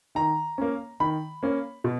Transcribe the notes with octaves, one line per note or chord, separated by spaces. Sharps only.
D#3 A#5
A#3 C#4
D#3 B5
A#3 C#4
B2